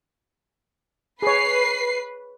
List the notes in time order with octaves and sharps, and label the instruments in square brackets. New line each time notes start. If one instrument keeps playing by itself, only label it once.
[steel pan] G#4 C#5 [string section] B4 C7